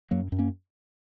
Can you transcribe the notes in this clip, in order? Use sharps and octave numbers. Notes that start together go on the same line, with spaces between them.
F#2 F#3 A#3
F#2
A#3 C#4